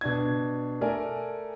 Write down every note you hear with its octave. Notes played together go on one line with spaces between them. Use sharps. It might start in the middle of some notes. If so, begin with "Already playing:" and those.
B2 D4 G#6
A3 A#4 D5 G#5